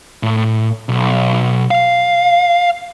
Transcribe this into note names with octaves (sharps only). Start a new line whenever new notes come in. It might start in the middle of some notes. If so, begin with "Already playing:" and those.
A2
B1
F5